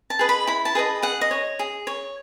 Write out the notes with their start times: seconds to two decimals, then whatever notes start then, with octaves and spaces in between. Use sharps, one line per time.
0.10 A5
0.19 G#4 B4 D#5
0.29 B5
0.47 E4 B5
0.65 A5
0.75 G#4 B4 D#5
1.02 G#4 F#5
1.21 D#5
1.31 C#5
1.59 G#4
1.87 C#5